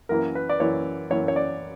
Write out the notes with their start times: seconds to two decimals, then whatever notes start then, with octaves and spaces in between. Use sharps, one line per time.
0.09 F#2 E3 A#3 A#4
0.35 B4
0.49 D5
0.60 F#2 E3 A#3 C#5
1.10 F#2 E3 A#3 C#5
1.28 C#5
1.36 D5